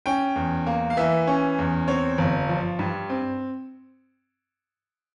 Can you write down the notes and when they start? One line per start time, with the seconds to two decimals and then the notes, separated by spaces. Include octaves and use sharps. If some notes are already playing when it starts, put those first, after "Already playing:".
0.06 C#4 G5
0.36 E2
0.66 A#3
0.90 F5
0.97 E3 E5
1.28 C#4
1.59 E2
1.88 C4 C#5
2.18 G1
2.49 F3
2.79 G2
3.10 C4